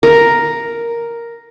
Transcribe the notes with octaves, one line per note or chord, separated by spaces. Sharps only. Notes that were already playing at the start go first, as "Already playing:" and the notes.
A#4